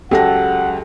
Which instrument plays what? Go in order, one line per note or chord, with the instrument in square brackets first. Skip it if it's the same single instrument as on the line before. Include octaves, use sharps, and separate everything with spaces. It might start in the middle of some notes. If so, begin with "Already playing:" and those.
[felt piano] C#2 F#3 A#6 [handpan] G4 A4 [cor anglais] F#5